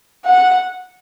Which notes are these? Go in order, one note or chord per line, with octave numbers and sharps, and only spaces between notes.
F#5